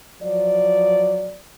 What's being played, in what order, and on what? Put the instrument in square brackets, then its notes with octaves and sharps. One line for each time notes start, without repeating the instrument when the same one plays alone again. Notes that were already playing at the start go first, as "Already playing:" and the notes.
[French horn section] F3 F#3 D5